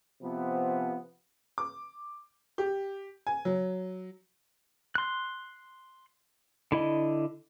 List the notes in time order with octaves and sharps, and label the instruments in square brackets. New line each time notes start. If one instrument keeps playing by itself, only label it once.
[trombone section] C3 F3 B3
[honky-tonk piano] D6
G4
G#5
F#3
[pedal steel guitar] C6 F#6
D3 E4 D#5